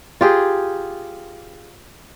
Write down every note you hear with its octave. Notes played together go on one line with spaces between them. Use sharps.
F4 G4 G#4